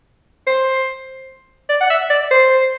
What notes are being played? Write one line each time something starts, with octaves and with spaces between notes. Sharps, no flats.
C5
D5
F#5
E5
D5
C5